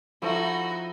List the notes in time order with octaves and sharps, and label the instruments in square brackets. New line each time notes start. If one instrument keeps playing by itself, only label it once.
[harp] F3 [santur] A3 C4 E4 [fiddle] D#4 F#4